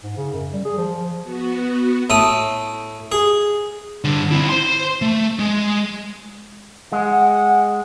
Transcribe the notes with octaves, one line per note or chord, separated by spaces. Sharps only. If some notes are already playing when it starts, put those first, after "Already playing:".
G#2
C#3
F#2
G3
G#4
F3
B3 F#4
A2 A3 D#6
G#4
G2 D3
C4 E4
C5 C6
A3
G#3
G#3 F#5